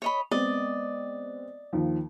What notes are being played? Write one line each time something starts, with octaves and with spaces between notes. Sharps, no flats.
C#5 D#5 B5
G#3 B3 C4 D5 D#5
D#2 D#3 F3